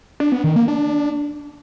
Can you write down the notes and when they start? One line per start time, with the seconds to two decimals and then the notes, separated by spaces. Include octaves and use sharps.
0.20 D4
0.32 B3
0.44 D#3
0.56 A#3
0.68 D4